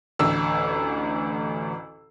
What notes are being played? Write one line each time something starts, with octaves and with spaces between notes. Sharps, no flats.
A1 D2 E6